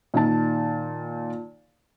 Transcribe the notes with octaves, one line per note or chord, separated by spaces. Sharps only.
A#2 D#3 A5